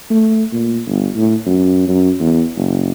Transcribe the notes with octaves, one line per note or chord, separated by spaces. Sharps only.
A3
A#2
G1
A2
F#2
F#2
E2
F#1